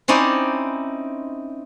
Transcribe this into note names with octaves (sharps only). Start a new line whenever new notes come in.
C4 C#4 D#4 E4 D5 G5